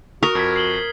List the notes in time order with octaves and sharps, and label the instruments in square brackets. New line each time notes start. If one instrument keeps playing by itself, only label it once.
[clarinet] F#4 [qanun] A#4 [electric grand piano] C#6 D#6
[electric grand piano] F2 [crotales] F6 G#6 B6
[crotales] C7 F#7 G7